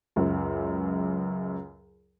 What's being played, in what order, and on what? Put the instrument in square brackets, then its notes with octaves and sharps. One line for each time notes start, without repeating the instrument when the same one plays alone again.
[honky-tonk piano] C#2 F#2